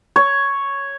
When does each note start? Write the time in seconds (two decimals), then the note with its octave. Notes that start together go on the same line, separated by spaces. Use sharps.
0.16 C#5